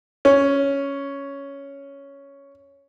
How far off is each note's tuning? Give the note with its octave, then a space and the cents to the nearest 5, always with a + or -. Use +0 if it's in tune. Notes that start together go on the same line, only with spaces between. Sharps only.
C#4 +5